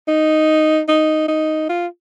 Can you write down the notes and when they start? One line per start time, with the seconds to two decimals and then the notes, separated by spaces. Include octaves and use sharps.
0.08 D#4
0.88 D#4
1.28 D#4
1.69 F4